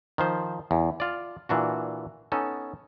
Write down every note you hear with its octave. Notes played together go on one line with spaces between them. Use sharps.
D#3 F3 C5
E2
F4 D5
A#2 E3 D4 F#4
B3 C#4 D#4 A4